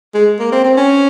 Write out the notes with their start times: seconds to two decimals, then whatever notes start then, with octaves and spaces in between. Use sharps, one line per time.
0.15 G#3
0.39 A#3
0.52 C4
0.65 C4
0.77 C#4